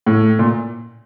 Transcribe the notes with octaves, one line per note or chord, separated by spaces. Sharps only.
A2
A#2